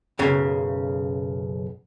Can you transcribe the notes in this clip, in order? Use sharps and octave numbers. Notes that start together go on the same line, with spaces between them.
B1 F#2 C#3